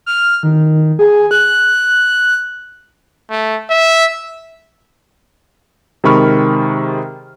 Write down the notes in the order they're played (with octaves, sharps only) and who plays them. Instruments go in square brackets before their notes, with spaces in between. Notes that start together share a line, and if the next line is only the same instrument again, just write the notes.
[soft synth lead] F6
D#3
G#4
F#6
[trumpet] A3
E5
[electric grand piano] C3 D#3 G#3 B5 C#6 F6